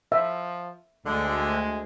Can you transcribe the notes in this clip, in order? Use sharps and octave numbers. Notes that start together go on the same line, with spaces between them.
F3 E5
D2 D3 G#3